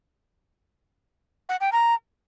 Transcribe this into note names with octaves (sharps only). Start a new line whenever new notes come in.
F#5
G5
A#5